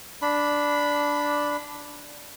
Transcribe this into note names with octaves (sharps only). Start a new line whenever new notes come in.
D4 B5